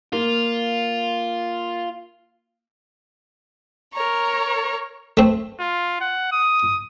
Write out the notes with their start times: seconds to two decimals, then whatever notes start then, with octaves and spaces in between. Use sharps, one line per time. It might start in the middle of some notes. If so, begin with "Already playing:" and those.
0.13 A#3 F4
3.92 A#4 C#5 A#5
5.17 A3 C4
5.60 F4
6.01 F#5
6.32 D#6